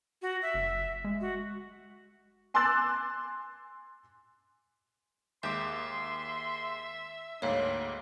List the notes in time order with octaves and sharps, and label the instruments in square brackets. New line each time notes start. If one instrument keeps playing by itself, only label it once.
[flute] F#4
E5
[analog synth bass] F#1
G#3
[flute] F#4
[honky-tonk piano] G#5 C6 D6 E6 F#6 A6
[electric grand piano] D#2 G#3 D6 [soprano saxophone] E5 [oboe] C6 [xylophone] G6
[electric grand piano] D2 G#2 A#3 [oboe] D4 [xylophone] C#5 F5 G5